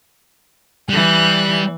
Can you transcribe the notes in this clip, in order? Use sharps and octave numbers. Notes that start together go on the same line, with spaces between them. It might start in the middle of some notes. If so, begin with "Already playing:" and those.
E3 G3 F#6